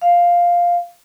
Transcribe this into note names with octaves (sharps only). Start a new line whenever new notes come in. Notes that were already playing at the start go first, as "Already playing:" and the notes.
F5